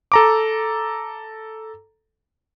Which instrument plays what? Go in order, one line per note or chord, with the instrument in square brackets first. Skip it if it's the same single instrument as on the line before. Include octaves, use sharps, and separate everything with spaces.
[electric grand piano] A4 A#5 D6